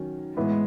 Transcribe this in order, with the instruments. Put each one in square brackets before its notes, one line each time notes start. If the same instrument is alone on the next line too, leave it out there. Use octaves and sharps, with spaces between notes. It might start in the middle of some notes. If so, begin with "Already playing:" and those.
Already playing: [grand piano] D#3 F#3 C#4 F#4
[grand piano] A2 E3 B3 E4 [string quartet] G#3